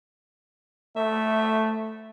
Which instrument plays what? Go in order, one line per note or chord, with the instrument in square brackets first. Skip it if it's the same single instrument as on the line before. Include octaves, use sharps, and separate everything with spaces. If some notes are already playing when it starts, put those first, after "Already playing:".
[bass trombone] A3 [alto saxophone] E5